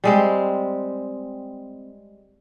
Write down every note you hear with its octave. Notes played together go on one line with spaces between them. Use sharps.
G3 G#3 C4